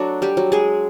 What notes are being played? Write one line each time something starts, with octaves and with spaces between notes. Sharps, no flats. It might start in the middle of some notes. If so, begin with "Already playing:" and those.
Already playing: F#3 A3 D4 F#4
G3 G4
F#3
G#3 G#4